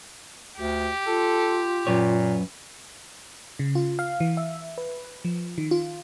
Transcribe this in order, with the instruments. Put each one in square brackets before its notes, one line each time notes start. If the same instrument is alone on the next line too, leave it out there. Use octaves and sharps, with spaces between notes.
[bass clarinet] D2 [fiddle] G4
[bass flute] F4 [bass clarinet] A4
[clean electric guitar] F#2 B4 C#5 [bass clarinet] A#2
[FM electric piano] C#3
F4
F5
E3
E5
B4
F3
D#3
F4